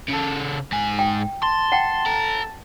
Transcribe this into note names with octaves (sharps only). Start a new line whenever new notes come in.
C#3 A4
G#2 G#5
G5
A5 C6
F#5 G5
A4 A#5